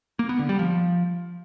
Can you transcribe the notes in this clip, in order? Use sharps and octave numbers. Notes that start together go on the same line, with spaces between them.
A#3
B3
D3
G3
F3